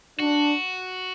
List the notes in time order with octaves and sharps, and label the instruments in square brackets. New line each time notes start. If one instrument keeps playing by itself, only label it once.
[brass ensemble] D4 [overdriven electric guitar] F#4